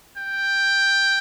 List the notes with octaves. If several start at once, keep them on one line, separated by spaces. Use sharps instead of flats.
G5